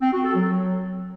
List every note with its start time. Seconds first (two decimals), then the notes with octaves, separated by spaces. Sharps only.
0.01 C4
0.12 F#4
0.24 A4
0.35 F#3